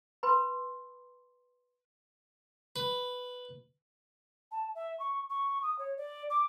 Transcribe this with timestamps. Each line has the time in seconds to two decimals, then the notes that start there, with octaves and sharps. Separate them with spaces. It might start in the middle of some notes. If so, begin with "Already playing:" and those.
0.23 B4 B5 C6
2.76 B4
4.52 A5
4.75 E5
5.00 C#6
5.30 C#6
5.63 D#6
5.79 C#5
5.97 D5
6.30 D6